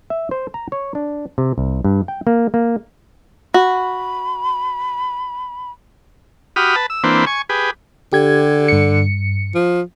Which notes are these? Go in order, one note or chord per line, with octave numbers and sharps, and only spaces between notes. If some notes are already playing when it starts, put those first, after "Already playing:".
E5
C5
A#5
C#5
D4
C3
C2
G2
G5
A#3
A#3
F#4 B5
F#4 G4 B5 D#6 F6
B4 A5
E6
E3 A#3 C4 D4 B4 C5
G#5 C#6
G4 G#4 B4
D3 G4 G#6
G2 C#7
F3